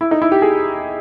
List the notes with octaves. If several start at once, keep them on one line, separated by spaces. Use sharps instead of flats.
E4
D#4
E4
G4
G#4